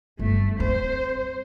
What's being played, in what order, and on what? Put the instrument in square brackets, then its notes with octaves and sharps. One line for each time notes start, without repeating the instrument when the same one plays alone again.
[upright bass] G1 [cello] A3
[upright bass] C4 [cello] C5